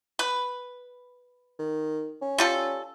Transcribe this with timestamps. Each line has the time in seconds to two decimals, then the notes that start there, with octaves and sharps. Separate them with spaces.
0.19 B4
1.59 D#3
2.22 C#4
2.38 G3 F4 A4